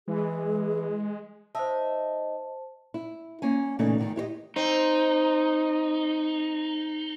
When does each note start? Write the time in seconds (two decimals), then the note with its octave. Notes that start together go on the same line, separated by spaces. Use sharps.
0.08 E3 G#3 G#4
1.55 D#4 C5 D#5 E5 A5
2.94 E4
3.42 A#3 C#4 G#5
3.79 A#2 C#3 E3 A3 C#4 D#4
3.98 E2 A2 D#3
4.16 E4 G4 C5 D#5
4.56 C4 D#4